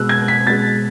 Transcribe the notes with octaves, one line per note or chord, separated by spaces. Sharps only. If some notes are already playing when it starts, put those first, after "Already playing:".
Already playing: B2 G#3 E6 F#6
G#6
B6
B2 G#3 A6